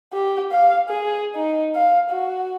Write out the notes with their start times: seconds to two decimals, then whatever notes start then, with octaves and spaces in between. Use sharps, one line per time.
0.13 G4
0.52 F5
0.89 G#4
1.35 D#4
1.75 F5
2.10 F#4